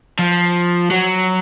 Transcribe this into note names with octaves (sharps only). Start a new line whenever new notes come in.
F3
F#3